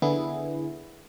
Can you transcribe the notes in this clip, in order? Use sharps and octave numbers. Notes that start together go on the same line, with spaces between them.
D3 B3 E4 G#4